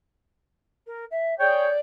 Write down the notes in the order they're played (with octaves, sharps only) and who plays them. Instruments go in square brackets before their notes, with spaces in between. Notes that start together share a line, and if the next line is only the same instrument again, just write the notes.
[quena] A#4
E5
[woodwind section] G#4 C#5 G5 [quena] D5